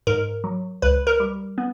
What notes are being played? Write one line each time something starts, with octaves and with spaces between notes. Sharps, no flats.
G#2 A#4
F#3
C#2 B4
A#4
G3
B3